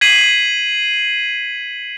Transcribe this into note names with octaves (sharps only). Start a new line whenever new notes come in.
G#6 B6 C7 D#7 F#7